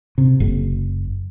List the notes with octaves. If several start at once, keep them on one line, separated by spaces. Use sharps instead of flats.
C3
F#1